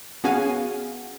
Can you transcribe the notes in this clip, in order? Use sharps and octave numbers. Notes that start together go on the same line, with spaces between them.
B3 C#4 F#4 G#4 F5 G#5